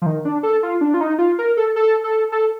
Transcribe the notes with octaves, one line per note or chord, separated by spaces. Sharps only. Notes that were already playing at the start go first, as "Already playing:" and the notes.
F3
D#3
D4
A4
F4
D4
F4
D#4
F4
A#4
A4
A4
A4
A4